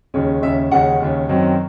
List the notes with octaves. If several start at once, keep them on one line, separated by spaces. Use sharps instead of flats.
D#2 C#3 G#3 C#4
D#2 C#3 G#3 C#4 E5
D#2 C#3 G#3 C#4 F#5
D#2 C#3 G#3 C#4
F#2 D#3 F#3 C4 D#4